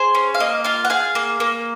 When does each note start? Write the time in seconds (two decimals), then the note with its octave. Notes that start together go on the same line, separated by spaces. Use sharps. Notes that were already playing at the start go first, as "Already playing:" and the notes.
Already playing: G#4 C5
0.15 C#4
0.34 F5
0.40 A#3 D#5
0.64 F4 F5
0.85 F#5
0.90 G#4 F5
1.15 A#3
1.40 A#3